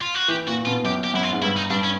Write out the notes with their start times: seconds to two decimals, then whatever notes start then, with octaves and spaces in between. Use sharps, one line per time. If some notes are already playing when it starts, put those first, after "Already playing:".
0.01 F4
0.15 F#4
0.28 E3 G4
0.47 A#2 F#4
0.66 B2 F4
0.84 F#2 G4
1.04 G4
1.14 F#2 E4
1.23 F4
1.33 G#2
1.42 G2 E4
1.56 D#4
1.70 G2 D4
1.84 C#4